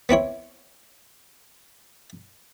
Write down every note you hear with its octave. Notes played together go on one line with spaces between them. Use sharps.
B3 C4 E4 C#5